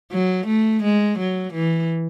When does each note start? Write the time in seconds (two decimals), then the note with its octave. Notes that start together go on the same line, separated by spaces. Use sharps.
0.12 F#3
0.47 A3
0.83 G#3
1.19 F#3
1.53 E3